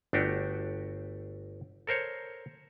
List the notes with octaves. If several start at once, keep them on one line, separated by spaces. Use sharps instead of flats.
G1 A3 D4 F#4 G4
A4 A#4 C5 C#5